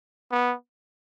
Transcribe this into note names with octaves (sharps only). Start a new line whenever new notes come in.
B3